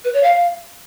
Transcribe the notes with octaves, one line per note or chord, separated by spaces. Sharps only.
B4
C#5
F5